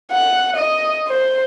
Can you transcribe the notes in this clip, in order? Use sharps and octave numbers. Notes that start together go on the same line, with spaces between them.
F#5
D#5
C5